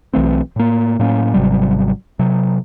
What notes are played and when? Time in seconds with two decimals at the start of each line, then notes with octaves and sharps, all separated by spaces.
0.14 B1 E3 A3 C4
0.56 A2 A#3
0.99 A2 F#3 A#3 C#4
1.34 G#1 C3 F#3 G3
2.19 C3 F#3